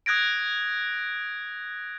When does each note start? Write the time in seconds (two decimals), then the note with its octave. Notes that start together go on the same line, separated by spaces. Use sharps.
0.06 D#6 F#6 G#6 A#6 D7